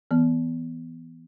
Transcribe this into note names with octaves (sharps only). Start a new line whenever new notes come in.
E3 B3